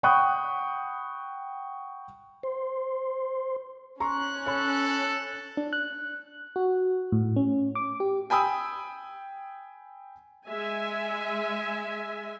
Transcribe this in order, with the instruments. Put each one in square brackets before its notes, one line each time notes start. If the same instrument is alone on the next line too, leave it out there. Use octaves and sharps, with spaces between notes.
[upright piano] F#5 G5 B5 C#6 D#6 F#6
[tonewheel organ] C5
[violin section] C#4 F#6 [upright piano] A#5 C6 C#6
[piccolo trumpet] A4 [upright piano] C#5 B5
[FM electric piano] D4
F#6
F#4
A2
C#4
D6
G4
[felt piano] G5 G#5 B5 D#6 E6
[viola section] G#3 E5 G#5